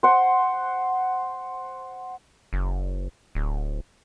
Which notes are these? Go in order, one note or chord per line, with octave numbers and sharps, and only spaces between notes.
C5 F#5
F#1
D1